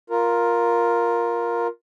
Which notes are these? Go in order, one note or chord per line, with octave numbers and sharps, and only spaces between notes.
F4 A#4